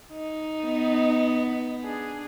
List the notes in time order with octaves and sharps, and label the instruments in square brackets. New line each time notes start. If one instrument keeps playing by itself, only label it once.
[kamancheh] D#4
[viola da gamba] B3
[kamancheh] D4 G#4